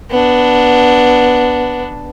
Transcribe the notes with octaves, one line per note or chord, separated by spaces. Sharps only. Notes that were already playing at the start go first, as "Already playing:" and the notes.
B3 D4